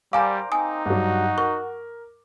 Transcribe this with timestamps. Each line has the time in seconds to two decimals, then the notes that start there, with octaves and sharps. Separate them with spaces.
0.13 G3 A#4 C5 D5 F5 G#5 A#5 D6
0.52 A#3 C4 D#4 G#5 D#6
0.86 G2 F#3 F#4
1.38 A#4 C#6